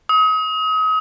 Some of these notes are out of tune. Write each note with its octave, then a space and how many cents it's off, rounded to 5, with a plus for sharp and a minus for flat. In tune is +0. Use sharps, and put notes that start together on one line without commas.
D#6 +35